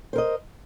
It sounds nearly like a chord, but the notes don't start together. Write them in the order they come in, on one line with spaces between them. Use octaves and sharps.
C5 A#4 D#5